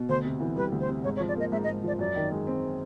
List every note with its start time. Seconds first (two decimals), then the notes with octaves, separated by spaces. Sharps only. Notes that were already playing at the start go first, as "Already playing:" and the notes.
Already playing: B2
0.09 D2 C5
0.25 C3
0.40 E3
0.56 G3 B4
0.72 D2
0.80 C5
0.89 C3
1.04 G#2 C#5
1.16 C#5
1.20 F3
1.28 D5
1.36 A#3 D#5
1.52 G#2 E5
1.64 D#5
1.67 G#2
1.84 F3 D5
1.99 F#2 D5
2.16 D#3
2.32 G#3
2.47 C4